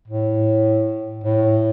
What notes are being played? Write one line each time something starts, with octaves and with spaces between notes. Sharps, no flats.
A2
A2